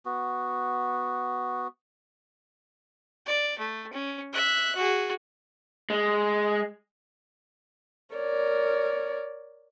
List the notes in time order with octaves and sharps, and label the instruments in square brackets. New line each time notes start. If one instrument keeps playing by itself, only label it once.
[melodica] B3 F#4
[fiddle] D5
A3
C#4
E5 F#6
F#4 G#4
[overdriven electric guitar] G#3
[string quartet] A#4 C#5 D5